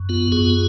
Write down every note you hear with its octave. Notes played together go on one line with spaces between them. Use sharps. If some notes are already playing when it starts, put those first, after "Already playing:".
Already playing: F#2
B3 F4
F#2 F4 G#4